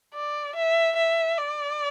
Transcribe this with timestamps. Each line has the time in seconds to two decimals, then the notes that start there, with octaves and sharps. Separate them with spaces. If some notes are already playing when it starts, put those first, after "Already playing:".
0.14 D5
0.55 E5
0.96 E5
1.38 D5